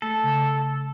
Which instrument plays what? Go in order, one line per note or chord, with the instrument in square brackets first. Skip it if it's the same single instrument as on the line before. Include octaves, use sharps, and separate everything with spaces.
[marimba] A3 [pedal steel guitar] A4
[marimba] C#3